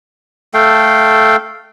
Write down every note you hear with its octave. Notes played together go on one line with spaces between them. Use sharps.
A3 A4 F5 G5